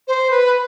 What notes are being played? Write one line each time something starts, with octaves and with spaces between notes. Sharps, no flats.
C5
B4